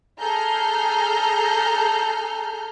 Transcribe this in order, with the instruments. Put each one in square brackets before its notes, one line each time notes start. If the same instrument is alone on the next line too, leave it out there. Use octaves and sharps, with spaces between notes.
[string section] G#4 A4 A#5 F6 G6